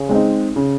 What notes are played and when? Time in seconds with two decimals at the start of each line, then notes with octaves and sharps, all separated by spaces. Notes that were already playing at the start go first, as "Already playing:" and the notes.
Already playing: C#3
0.09 G#3 C4 D#4
0.56 C#3